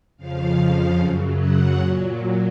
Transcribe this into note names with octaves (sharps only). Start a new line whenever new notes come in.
F2 C#3 F3 F5
F5
F#2 C#3 F#3
F#5
A#2 F#3